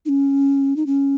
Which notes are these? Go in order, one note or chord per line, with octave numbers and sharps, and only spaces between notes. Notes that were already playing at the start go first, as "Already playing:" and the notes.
D#4
C#4
D#4
C#4